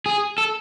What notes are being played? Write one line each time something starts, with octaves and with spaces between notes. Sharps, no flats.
G#4
A4